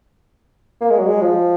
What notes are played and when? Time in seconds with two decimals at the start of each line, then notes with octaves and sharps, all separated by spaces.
0.81 A#3
0.90 G#3
0.99 F#3
1.07 G#3
1.22 F3